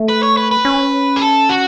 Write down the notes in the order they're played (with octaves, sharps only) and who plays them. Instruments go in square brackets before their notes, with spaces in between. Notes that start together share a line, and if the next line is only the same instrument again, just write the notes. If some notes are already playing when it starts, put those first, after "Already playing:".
Already playing: [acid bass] A3
[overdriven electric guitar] B4
C#5
B4
B4
[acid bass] C#4
[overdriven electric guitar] G#4
A4
F#4